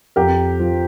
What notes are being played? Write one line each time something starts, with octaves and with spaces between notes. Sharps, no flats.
F2 G4 A#4
F3